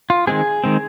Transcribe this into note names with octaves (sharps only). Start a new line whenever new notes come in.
F4
D#3 G#3 C4 G#4
D#3 G#3 C4